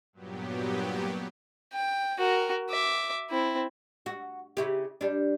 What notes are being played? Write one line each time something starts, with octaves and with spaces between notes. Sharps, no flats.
G2 A#2 F#3 B3 G4
G5
F#4 A#4
E5 D6
C4 E4
F#4
C#3 E4 G4
G3 D4